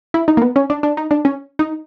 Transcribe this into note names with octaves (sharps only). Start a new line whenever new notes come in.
E4
D#4
A#3
B3
C#4
D4
D4
D#4
D4
C#4
D#4